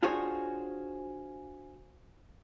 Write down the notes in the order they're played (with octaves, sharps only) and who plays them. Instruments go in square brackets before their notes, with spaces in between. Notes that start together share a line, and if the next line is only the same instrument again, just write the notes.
[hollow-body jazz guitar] D4 F4 F#4 G#4 C5 C#5